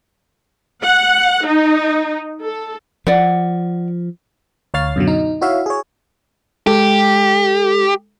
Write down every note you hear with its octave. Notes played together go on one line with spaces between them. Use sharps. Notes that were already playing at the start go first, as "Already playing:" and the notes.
F#5
D#4
A4
F3 D5 F#5
D2 C#5 F5 F6 A6 C7
F#2 B2 D3 F#3
D#4
E4 F#4 C#5 E5 F5
G#4 C#5
G#3 G4 A4